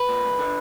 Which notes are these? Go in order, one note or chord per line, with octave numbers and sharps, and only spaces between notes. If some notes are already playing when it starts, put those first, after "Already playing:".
Already playing: B4
A#2
C2
D3